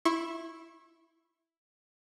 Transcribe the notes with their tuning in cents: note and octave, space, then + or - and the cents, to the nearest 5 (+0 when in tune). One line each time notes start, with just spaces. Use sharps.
E4 +0 C#6 -35